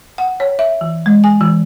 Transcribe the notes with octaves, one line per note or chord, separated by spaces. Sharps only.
F#5
C#5
E5
E3
G#3
G#5
E3